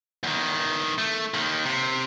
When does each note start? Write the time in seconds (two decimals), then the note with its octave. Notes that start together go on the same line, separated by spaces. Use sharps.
0.24 E2 D#3
0.98 A3
1.34 D#2 D#3
1.65 C3